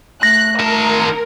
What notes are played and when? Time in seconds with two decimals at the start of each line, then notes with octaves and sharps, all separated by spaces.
0.23 A3 F#6 A#6
0.60 D#3 A#4 A5